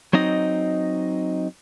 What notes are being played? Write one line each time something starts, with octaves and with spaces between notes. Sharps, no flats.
F#3 C4 D#4 D#5